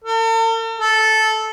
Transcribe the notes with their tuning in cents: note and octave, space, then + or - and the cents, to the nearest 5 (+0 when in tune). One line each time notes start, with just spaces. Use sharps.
A4 +45
A4 -10